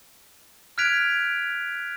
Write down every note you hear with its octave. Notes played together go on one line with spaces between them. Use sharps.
F6 F#6 G#6 B6 D7 F7